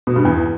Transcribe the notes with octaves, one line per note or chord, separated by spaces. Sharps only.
B2
G2
E2